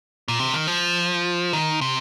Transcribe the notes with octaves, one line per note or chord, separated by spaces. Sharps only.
A#2
C3
D#3
F3
D#3
C3